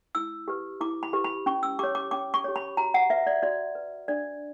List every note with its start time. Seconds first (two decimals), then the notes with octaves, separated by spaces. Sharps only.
0.15 E4 E6
0.48 G4 B4
0.81 E4 D6
1.03 B5
1.13 G4 B4
1.24 B5
1.46 C#4 C#6
1.63 E6
1.79 G4 C#5 D6
1.95 D6
2.11 C#4 D6
2.34 C#6
2.44 G4 C#5
2.56 B5
2.77 F#4 A#5
2.94 F#5
3.10 B4 E5
3.27 D5
3.43 F#4 D5
3.75 B4
4.08 D4 D5